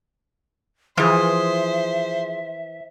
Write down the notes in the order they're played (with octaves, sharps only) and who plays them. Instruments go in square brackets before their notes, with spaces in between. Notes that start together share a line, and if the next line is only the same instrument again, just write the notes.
[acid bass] E3 [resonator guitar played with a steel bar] F3 G#4 [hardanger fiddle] C5 [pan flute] E5